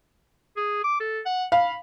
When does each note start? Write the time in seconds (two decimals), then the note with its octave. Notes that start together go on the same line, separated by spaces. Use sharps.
0.57 G#4
0.84 D6
1.00 A4
1.26 F#5
1.52 F5 B5